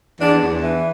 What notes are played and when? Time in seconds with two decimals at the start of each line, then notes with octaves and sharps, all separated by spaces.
0.21 E2 D4
0.42 E2
0.62 E3